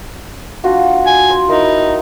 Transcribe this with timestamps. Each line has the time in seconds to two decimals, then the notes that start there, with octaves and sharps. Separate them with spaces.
0.64 D4 F4 F#4
1.06 G#5
1.30 C6
1.49 D#4 E4 A#4 B5